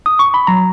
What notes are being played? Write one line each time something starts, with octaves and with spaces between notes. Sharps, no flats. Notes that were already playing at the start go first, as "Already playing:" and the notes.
D#6
C#6
B5
F#3 A#5